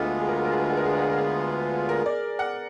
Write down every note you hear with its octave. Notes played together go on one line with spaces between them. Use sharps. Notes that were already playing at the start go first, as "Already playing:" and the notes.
Already playing: D2 D3 G#3 B3 F4
G#4
A#4
G#4
A#4
G#4
A#4
G#4
A#4
G#4
A#4
G#4
A#4
G#4
A#4
D5
F#5